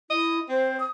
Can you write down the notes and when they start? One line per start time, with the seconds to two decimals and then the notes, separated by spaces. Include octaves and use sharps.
0.10 E4 D#5
0.49 C4 C5
0.80 D#6